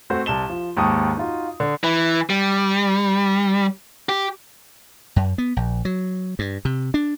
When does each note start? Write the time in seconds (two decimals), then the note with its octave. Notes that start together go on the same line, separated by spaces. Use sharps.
0.10 A3 C4 F#4 C5
0.26 C2 A5 E7 G7
0.50 F3
0.77 D#2 G#2 G5 A5 C#6 D#6
1.17 D#4 F4 F#4
1.60 D3
1.84 E3
2.30 G3
4.09 G4
5.16 F#2
5.38 B3
5.57 A#1
5.85 F#3
6.39 G2
6.65 C3
6.94 D4